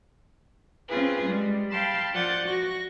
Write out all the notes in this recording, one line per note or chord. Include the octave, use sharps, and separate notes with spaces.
C4 C#4 F4 G#4 B4
G3 G#3
F5 G5 A5 B5 C6
F3 F4 D5 F#5 G6 A6
F#4 C#6 A#6